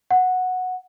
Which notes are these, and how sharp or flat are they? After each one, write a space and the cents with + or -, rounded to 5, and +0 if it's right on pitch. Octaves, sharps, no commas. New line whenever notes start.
F#5 -10